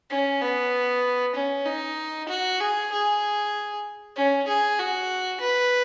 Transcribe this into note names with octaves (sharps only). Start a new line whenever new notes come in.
C#4
B3
C#4
D#4
F#4
G#4
G#4
C#4
G#4
F#4
B4